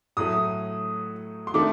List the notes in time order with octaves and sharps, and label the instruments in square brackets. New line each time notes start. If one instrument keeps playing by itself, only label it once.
[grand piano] A2 F#3 A3 [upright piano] D#6
[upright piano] C6
[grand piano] D#3 A3 D4 [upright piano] D6